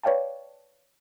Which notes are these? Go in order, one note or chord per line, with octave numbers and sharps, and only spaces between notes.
B4 C#5 D5 F5 G5 A5